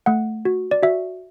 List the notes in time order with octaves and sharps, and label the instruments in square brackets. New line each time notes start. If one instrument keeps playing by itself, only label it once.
[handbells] A3 F#5
F#4
D5
F#4 E5